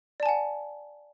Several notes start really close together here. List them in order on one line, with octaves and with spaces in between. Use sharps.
D5 A5 G#5 F#5